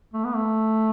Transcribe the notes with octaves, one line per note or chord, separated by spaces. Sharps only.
A3
B3
A3